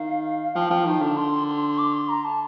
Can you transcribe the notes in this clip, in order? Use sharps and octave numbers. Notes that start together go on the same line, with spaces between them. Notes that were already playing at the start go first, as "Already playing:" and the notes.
Already playing: D#3 F5
F5
F3 G5
F3 G5
D#3 G5
D3 A5
C6
C6
C6
D6
C6
A#5
A5